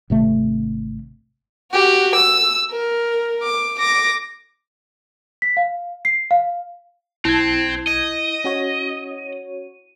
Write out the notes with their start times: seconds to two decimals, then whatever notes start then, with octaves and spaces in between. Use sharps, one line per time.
0.10 G#1 C3 A3
1.72 F#4 G4
2.16 E6
2.71 A#4
3.43 D6
3.79 D6 A#6
5.42 B6
5.57 F5
6.05 C7
6.31 F5
7.25 B1 C4 E4 G#6
7.87 D#5 D#7
8.44 C#4 F#4 C#5